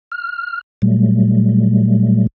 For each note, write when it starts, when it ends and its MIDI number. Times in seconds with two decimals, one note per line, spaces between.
0.12 0.61 89
0.82 2.27 46
0.82 2.27 54
0.82 2.27 55
0.82 2.27 57